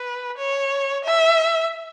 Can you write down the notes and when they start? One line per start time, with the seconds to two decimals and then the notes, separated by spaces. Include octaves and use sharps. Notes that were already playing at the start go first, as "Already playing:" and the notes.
Already playing: B4
0.38 C#5
1.04 E5